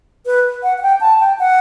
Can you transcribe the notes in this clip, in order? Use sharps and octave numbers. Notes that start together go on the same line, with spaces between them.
B4
F#5
F#5
G5
A5
G5
F#5